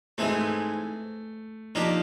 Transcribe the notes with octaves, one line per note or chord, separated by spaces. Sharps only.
G#2 E3 G#3 A3 C4
F3 A#3 D4 D#4 G4